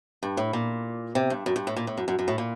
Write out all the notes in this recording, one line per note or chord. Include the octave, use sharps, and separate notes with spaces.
G2
A2
A#2
C3
G2
F#2
G2
A2
A#2
A2
F#2
F#2
F#2
A2
A#2